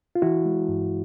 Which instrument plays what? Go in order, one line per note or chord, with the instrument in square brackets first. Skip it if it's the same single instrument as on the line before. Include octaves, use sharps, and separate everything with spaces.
[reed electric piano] F4
E3 E4 F#4
G#3
G2